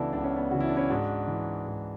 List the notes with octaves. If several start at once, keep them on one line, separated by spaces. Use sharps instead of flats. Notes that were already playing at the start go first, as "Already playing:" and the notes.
Already playing: C#2 C#3 E3 B3 D4 E4 F#4 A4
C#2 D4
C#4
B3 D4
C#3 E3 F#4
E4
D4
C#4 E4
G#2 D4 F#4
E3
G#2